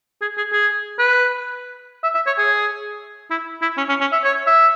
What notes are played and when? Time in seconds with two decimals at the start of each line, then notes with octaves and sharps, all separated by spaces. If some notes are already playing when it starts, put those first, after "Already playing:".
0.22 G#4
0.37 G#4
0.53 G#4
0.99 B4
2.03 E5
2.15 E5
2.27 C#5
2.38 G#4
3.31 E4
3.62 E4
3.78 C#4
3.89 C#4
4.01 C#4
4.12 E5
4.24 C#5
4.47 E5